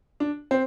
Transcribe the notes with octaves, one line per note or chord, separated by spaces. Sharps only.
D4
C4